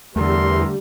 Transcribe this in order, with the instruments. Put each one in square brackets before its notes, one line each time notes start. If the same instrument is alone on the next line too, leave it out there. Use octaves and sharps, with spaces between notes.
[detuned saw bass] E2 [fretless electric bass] D3 A3 [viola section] G3 [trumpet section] A#4 E5 C6